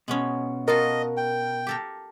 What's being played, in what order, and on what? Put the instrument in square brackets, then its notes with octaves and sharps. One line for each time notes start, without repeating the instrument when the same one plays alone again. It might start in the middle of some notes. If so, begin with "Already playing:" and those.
[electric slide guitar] B2 [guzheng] G#3 B3 C#4
[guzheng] F4 F#4 A4 [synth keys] A#4 [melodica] D#5
[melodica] G5
[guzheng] G4 A4 A#4